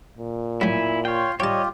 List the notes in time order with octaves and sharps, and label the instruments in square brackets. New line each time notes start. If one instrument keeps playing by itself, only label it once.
[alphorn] A#2
[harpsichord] F#3 A3 [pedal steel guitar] E4 E5 G#5
[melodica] F4 C6 [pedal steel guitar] C#5 G5
[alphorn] G3 [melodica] F4 G4 [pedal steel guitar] C#5 D#5 [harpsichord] G5 A5